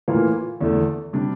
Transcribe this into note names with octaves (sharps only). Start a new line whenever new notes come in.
A2 E3 A#3 F4
E2 D3 A3
C3 G3 D4